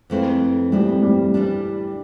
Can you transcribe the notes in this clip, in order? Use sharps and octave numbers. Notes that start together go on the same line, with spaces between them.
F2 E3 A3 C4
F2 E3 G3 A3 C4
G3
E3 G3 D4